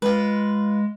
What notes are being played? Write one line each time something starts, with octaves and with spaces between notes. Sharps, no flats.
G#3 F4 B4